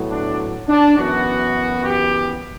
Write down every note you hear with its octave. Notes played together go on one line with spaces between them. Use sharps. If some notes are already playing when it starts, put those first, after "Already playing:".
Already playing: A2 F#3 B3
D4
D4
F#2 E3 B3 F#4
G4